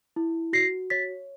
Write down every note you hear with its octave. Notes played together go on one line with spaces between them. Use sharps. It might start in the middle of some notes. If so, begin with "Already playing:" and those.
E4
F#4 A#6 C7
C#5 A6 B6